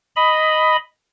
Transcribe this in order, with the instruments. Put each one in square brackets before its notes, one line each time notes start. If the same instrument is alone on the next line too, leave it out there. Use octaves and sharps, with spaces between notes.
[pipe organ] D#5 B5